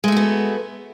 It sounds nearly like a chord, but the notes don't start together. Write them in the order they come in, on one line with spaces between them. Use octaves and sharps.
G#3 A3 F#4 B3